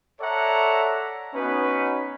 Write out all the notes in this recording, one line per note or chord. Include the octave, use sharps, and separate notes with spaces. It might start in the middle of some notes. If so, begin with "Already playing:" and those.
A4 C#5 D5 E5 F#5 A#5
B3 C#4 D#4 F#4 B4